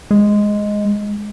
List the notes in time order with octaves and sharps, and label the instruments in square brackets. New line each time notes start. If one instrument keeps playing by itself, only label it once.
[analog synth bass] G#3